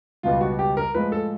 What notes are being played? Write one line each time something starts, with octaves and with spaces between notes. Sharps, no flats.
C#2 B2 G3 F4
F#4
G4
A#4
A2 F3 G#3 B4
A4